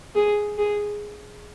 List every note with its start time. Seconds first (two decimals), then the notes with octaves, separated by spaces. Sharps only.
0.15 G#4
0.58 G#4